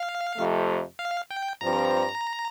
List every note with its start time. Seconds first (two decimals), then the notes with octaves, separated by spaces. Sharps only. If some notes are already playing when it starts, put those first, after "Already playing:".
Already playing: F5
0.37 F2 C3 F3 A3
0.99 F5
1.30 G5
1.61 G2 F3 C4 A#5